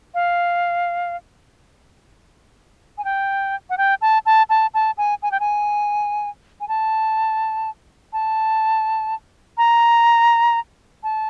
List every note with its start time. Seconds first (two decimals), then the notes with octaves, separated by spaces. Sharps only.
0.15 F5
2.98 G#5
3.05 G5
3.70 F#5
3.78 G5
4.01 A5
4.26 A5
4.50 A5
4.74 A5
4.98 G#5
5.23 G#5
5.32 G5
5.40 G#5
6.61 G#5
6.68 A5
8.13 A5
9.58 A#5
11.03 A5